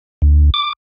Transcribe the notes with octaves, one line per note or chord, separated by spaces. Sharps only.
D2
D6